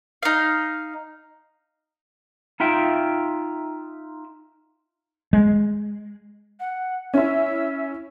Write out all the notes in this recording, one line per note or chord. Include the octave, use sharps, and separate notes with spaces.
D#4 F5
D#4 F4 E5 G5
G#3
F#5
C#4 E4 E5